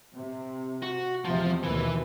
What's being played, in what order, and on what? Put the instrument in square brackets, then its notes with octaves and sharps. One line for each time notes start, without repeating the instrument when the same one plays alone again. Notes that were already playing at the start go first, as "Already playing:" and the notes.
[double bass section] C3
[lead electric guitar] F#4
[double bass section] E2 C3 G#3 [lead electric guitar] F3
[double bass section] D#2 B2 [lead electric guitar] E3 B4